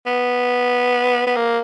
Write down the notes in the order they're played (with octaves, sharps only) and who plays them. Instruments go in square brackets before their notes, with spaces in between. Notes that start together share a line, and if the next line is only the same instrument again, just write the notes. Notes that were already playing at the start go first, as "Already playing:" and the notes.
[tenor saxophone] B3
B3
A#3